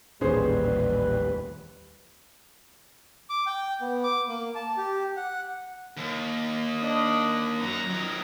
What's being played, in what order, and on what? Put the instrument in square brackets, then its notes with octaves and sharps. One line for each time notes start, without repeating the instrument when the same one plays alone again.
[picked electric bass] A1 A#2 [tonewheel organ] D#2 B4 [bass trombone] G3 [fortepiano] C#4 G#4 C5
[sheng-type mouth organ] D6
G5
B3
D6
A#3
A5
G4
F#5
[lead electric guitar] D#2
[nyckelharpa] D4 D#5
[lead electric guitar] F#2 F#4 [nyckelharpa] A#5
[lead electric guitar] D#3 F#3